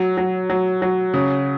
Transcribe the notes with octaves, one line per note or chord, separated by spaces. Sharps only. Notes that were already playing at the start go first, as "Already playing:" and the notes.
Already playing: F#3
F#3
F#3
F#3
C#3